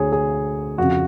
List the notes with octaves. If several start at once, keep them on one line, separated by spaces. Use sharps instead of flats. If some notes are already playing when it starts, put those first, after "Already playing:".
Already playing: D2 D3 G#4 C#5
G#4
F2 C#3 F#4